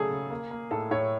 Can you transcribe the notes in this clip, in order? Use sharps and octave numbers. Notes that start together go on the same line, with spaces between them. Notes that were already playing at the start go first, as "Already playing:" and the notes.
Already playing: C#3 F#3 A3 G#4 A4
C#3
A#3
A#3
A2 A4
A2 C#5